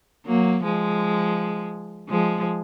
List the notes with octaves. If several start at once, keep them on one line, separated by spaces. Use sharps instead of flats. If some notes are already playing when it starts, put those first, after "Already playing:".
F#3 A#3
F3 G#3
F3 G#3